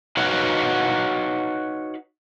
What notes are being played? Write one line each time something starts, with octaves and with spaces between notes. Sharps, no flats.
D#4 F#4 B4 C#5 F5 F#5